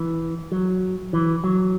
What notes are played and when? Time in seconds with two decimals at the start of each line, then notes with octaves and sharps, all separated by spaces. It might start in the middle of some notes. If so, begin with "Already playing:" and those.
Already playing: E3
0.52 F#3
1.13 E3
1.44 F#3